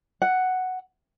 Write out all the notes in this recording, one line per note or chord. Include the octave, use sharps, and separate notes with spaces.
F#5